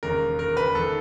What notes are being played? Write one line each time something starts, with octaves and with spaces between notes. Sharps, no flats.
E1 D#2 C#3 A#4
A#4
B4
D#2 D#3 A4